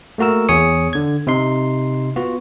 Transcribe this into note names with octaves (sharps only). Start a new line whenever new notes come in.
A3 A#3 F#4 A#4 E6
E2 G#4 C#5 D#6 C#7
D3 G#6
C3 D#4 C6
B3 F4 F#4